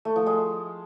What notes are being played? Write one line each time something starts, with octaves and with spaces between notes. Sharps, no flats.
A3
F3
G#3